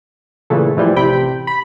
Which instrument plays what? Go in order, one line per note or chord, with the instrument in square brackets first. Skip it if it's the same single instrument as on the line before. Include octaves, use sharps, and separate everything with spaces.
[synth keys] A#2 C#3 E3 A3
A2 E3 F3 G3
A1 C3 G5 B5
B5